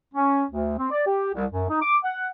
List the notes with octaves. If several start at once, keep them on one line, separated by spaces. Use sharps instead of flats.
C#4
D2
C4
D5
G4
C2
F#2
D#4
D6
F#5